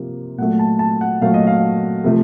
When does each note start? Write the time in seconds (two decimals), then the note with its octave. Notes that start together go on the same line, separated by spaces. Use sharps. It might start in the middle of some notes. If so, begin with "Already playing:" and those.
Already playing: C3 F3 A#3
0.38 A#2 F#3 A3 F#5
0.59 A5
0.79 A5
1.01 F#5
1.21 A#2 F#3 A3 F5
1.34 D#5
1.47 F5
2.04 C3 F3 A3